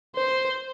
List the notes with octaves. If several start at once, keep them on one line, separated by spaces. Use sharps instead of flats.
C5